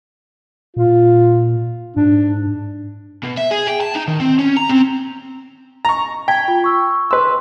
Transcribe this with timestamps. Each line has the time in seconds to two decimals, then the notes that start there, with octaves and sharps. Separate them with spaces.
0.76 A#2 F4
1.96 G#2 D4
3.23 B2
3.37 E5
3.51 G#4
3.67 G5
3.81 A5
3.95 D#4
4.07 D#3
4.20 C4
4.38 C#4
4.57 A#5
4.69 C4
5.85 A#5 C#6
6.28 G5 A5 G#6 B6
6.48 F4
6.64 C#6 E6
7.11 B4 C6 E6